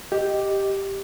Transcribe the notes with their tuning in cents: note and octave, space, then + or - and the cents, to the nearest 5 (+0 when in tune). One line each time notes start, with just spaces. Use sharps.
G4 +0 D#5 +0